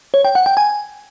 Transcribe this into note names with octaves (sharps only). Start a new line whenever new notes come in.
C#5
G5
F#5
G5
G#5